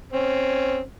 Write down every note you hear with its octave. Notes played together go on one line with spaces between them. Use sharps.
C4 C#4